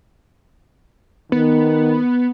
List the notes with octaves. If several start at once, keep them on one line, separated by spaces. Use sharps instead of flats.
D#3 B3